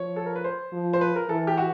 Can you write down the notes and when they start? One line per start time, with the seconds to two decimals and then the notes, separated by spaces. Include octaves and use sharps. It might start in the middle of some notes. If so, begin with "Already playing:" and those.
Already playing: F3 C#5
0.16 A4
0.26 A#4
0.36 B4
0.44 C5
0.73 F3
0.93 C5
1.01 B4
1.16 A#4
1.29 E3 A4
1.47 G4
1.58 F#4